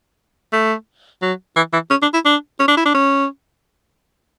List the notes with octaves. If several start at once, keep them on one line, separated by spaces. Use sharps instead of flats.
A3
F#3
E3
E3
C#4
D4
E4
D4
C#4
D4
E4
D4
C#4